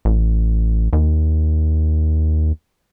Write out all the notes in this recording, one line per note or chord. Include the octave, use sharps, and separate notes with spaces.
A1
D#2